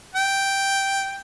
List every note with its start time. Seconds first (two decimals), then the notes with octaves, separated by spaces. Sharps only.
0.15 G5